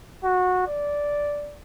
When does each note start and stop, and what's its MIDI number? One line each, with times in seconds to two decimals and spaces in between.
0.24 0.65 66
0.67 1.58 74